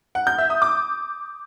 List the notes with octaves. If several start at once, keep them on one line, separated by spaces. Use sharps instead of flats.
F#5
G6
E5
D#6
D6